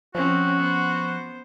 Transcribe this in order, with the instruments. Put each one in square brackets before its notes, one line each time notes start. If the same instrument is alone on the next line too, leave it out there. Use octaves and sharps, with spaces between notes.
[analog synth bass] F3 [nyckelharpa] C4 C#4 [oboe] F#4
[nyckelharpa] B3 C5